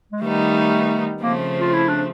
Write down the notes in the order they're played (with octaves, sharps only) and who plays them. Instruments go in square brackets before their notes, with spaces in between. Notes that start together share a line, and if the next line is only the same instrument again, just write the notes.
[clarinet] G#3
[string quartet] D#3 G3 B3 D#4 [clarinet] A3
[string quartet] C#3 F3 A3 C4 [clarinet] A#3
[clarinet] F4
E4
D4